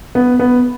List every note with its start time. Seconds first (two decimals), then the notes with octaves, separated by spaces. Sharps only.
0.15 B3
0.39 B3